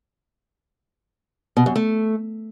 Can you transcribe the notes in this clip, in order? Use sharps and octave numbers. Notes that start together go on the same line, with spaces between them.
B2
F#2
A3